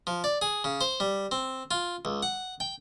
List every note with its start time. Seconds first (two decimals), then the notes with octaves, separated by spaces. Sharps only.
0.07 F3
0.24 D5
0.42 G#4
0.64 C#3
0.81 C5
1.00 G3
1.31 C4
1.71 F4
2.05 C#2
2.23 F#5
2.60 G5